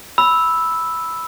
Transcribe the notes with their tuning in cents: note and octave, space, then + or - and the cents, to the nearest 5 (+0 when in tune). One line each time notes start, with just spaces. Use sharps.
B5 +0 E6 -5